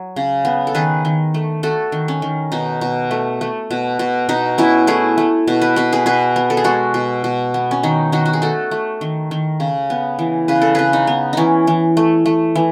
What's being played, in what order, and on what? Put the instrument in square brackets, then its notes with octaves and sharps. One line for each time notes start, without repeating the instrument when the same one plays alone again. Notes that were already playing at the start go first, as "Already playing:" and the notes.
Already playing: [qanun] F#3
C#3
B3
A4
D#3 G#4 B4
D#3
A3
A3 F#4 A4
D#3
C#4
D#3
B2 D#4
B2
A3
A3
B2
B2
B2 D#4
B2 C#4 E4
A3 E4 G#4
A3
B2
B4
B2 B4
G#4 B4
B2 G#4 B4
B3
A4
G#4
G#3 F#4 A4
B2
B2
B3
C#4
D#3 D#4
D#3 D#4 F#4
F#4
G#4
A3 F#4 A4
A3
D#3
D#3
C#3
B3
E3
C#3 B4
A4
C#3 G#4 B4
D#4
B3
E3 C#4 D#4
E3
A3
A3
E3